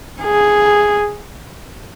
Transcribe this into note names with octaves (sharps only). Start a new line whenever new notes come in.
G#4